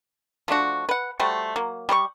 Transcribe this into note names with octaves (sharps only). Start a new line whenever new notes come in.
F3 A3 D4 F#4
B4 F#5
G3 A3 F#4 C5
F#3 A#3
G3 G4 C5 C#6